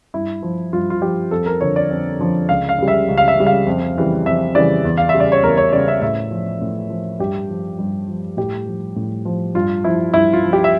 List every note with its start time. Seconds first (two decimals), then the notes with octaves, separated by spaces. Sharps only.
0.14 G2 E4
0.42 F3
0.73 G2 F4
0.90 F4
1.02 F3 G4
1.31 F2 A4
1.46 A#4
1.61 D3 F3 C#5
1.76 D5
1.90 F2
2.19 D3 F3
2.49 C#2 F5
2.69 F5
2.79 C#3 G3
2.88 E5
3.08 C#2
3.18 F5
3.28 E5
3.37 C#3 G3
3.47 F5
3.66 F2
3.96 C#3 E3 G3
4.26 F2 E5
4.55 C#3 E3 G3 D5
4.84 E2
4.98 F5
5.09 E5
5.14 C#3 G3
5.20 D5
5.32 C#5
5.43 E2 A#4
5.57 C#5
5.73 C#3 G3 D5
5.88 E5
6.02 A2 E5
6.31 F3
6.61 A2
6.90 F3
7.19 G2 G4
7.49 F3
7.79 G2
8.08 F3
8.37 A2 G4
8.66 F3
8.96 A2
9.25 F3
9.55 G2 F4
9.84 F3 E4
10.13 G2 E4
10.33 F4
10.43 F3
10.53 G4
10.64 E5